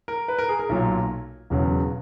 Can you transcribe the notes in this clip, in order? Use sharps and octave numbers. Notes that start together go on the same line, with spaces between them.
A#4
B4
A#4
G#4
A#4
B1 A#2 F#3
E1 E2 C#3 F#3